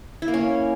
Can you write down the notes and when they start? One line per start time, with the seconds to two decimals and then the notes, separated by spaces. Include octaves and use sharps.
0.22 E4
0.28 A#3
0.34 C#4